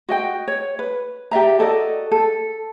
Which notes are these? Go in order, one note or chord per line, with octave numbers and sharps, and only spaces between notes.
F#4 D#5 G5
C#5
B4
G4 D5 E5 A#5
F#4 A4 D5 D#5
A4